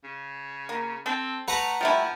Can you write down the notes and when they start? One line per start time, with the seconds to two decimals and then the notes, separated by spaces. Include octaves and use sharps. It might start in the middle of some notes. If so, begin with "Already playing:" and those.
0.04 C#3
0.69 A#3
1.06 C4 A4
1.48 A3 B4 F#5 A#5
1.81 F3 G3 A3 E4